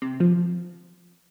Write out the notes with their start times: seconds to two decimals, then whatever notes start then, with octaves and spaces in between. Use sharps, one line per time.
0.02 C3
0.20 F3